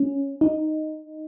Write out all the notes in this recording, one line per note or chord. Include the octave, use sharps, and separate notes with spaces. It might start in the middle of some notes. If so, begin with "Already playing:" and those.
Already playing: C#4
D#4